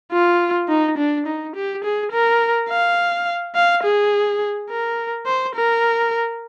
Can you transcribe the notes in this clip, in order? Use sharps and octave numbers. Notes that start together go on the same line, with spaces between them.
F4
D#4
D4
D#4
G4
G#4
A#4
F5
F5
G#4
A#4
C5
A#4